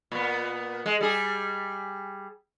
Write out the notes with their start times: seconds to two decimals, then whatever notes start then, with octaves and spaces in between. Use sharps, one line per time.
0.12 A#2 B3
0.86 G#3
1.01 G3 G#4